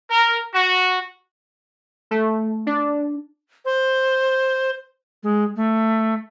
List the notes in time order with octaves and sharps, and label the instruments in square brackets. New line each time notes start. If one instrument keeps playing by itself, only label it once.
[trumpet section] A#4
F#4
[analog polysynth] A3
D4
[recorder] C5
G#3
A3